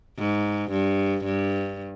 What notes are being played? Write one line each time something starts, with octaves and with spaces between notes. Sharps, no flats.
G#2
G2
G2